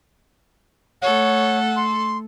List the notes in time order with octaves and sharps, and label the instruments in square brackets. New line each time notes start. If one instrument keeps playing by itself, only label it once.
[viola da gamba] A3 A4 [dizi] C#5 [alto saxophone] F#5
[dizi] C6